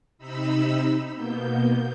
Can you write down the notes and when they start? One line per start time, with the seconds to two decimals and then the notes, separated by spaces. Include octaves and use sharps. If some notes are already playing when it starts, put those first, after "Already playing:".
0.18 C3 D#4 B5 E6
1.15 B2 A#3 B3 G6